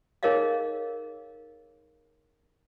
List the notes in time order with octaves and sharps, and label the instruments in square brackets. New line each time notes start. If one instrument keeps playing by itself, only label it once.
[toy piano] D#4 G#4 A#4 C#5 D#5 F5